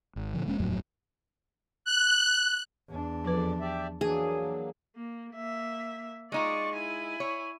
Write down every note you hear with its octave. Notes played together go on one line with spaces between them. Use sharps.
G#1
A#2 D3 F3
E1 G#3 A#3 C#4
D#1 F2 A2 F#3
F#6
E2 D4
F2 F3 B4 D5
G4 D5 E5
E3 F#3 A#3 D4 G#4
A#3
A#3 E5
G#3 D#4 F4 D5 C#6
E4 G#5
C#5